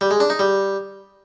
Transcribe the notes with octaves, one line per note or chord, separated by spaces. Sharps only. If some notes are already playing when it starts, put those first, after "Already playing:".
G3
G#3
D4
D#4
G3